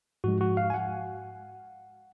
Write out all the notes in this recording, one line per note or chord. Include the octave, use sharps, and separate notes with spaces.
G#2 F3 G#3 F#4
F#4
F5
G#5
F#5